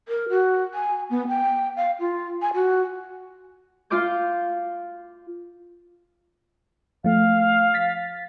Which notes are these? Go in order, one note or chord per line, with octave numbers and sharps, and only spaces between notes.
A#4
F#4
G#5
B3
G5
F5
F4
G#5
F#4
F4 F5 C6 D6 G6
F3 A3 F5
A6 B6